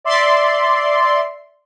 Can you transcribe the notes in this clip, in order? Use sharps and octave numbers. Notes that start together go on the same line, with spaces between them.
D5 E5 C6